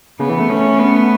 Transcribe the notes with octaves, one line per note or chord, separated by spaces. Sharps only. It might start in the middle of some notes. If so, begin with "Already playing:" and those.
C#3 B3
E3
A3
C#4
B3